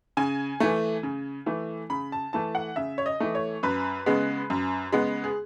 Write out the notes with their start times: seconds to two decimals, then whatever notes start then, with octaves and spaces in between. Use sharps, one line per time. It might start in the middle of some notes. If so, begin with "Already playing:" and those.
0.17 C#3 G#5
0.60 E3 A3
1.03 C#3
1.46 E3 A3
1.90 C#3 B5
2.12 A5
2.33 E3 A3 A5
2.55 F#5
2.76 C#3 E5
2.98 C#5
3.06 D#5
3.20 E3 A3
3.35 C#5
3.63 F#2 B4
4.06 C#3 G#3 B3
4.50 F#2
4.93 C#3 G#3 B3
5.24 G#4